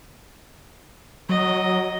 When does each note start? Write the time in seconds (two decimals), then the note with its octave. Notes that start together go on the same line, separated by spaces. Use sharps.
1.29 F#3 D#5